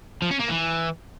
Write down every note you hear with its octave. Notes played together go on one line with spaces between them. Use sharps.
F3
C#4
A#3
E3